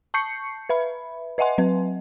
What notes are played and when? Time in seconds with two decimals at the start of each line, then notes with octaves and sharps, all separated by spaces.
0.14 A5 C#6 G6 C7 C#7
0.69 B4 E5 B5
1.38 B4 D#5 E5 F#5 G#5 C6
1.58 F#3 C4 B4